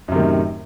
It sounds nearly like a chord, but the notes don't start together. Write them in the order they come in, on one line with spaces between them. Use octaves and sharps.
F#2 C3 D#3 A2